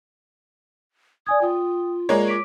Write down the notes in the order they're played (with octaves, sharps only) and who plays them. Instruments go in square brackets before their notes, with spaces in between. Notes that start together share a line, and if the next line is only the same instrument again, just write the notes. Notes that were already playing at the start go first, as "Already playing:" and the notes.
[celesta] D5 G#5 G#6 [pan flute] D#6
[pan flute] F4 [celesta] G5 D#6
[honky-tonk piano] G#3 A#3 C#5 [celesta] D5
[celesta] D6 B6 D7